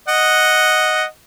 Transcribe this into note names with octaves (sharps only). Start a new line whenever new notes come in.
D#5 F#5